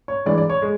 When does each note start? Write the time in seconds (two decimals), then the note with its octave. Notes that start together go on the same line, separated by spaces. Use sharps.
0.08 C#5
0.26 G2 E3 G#3 D5
0.38 D5
0.50 C#5
0.62 G#3